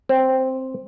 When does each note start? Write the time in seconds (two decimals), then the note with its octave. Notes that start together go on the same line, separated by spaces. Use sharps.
0.09 C4